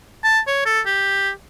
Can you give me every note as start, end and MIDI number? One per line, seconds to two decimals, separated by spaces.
0.24 0.40 81
0.47 0.65 73
0.66 0.80 69
0.86 1.30 67